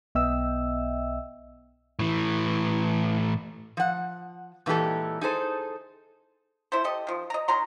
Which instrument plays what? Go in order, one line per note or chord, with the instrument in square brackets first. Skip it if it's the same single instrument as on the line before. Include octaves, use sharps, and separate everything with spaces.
[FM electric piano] B1 B3 D#5 E5 G5 E6
[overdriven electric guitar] A2 E3
[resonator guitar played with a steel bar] F3 F#5
A#2 E3 G#3 G4 A4
D#4 G#4 A4 C5
[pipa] E4 A4 C5
G4 A4 D#5
D#3 F3
D#5 A#5
D#3 F#3 A#5 C6